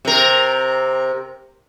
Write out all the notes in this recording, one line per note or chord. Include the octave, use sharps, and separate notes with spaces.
C3 A#4